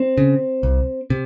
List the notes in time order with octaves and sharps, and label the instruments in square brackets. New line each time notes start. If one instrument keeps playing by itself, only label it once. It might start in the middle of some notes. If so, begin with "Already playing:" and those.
Already playing: [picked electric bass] C4
C#3
C2
C3